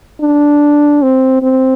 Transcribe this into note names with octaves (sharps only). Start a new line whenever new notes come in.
D4
C4
C4